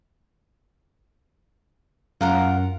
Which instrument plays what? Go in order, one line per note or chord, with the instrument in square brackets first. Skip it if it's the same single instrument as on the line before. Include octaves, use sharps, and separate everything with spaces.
[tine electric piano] F#2 [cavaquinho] F4 A#4 F#5